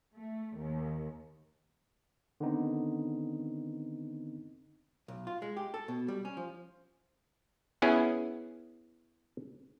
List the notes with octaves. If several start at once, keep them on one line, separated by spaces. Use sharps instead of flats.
A3
D#2
D3 D#3 B3 C4 D#4
B1
F4
G#3
G4
A4
B2
G3
C#4
F3
B3 C#4 E4 G#4